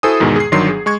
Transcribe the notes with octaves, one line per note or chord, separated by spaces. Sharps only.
E4 F#4 A4 C5 G#5 D#6
E2 G#2 B2 D#3 G#3
G#4 C7
G1 D#3 F#3 D4 C6 C7
G#4
G#3 C#6 G#6